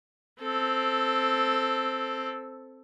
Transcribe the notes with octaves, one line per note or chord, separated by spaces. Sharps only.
C4 A4